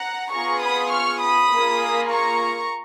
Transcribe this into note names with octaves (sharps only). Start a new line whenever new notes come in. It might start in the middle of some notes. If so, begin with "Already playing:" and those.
Already playing: F#5 A#5
B3 F4 G#4 A#5 C#6
B5 D#6
C#6 F6
B5 D#6
A#3 F4 G#4
A#5 C#6